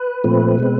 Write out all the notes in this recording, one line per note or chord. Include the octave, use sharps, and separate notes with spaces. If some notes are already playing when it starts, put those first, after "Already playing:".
Already playing: B4
A#2 F3 A3 C4
B2 G#3 C4